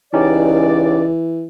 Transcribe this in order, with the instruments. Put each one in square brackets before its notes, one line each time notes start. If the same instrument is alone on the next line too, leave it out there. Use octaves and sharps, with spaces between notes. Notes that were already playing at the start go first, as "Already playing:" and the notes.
[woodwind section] C#2 D5 [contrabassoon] E3 [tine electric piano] C#4 D#4 G4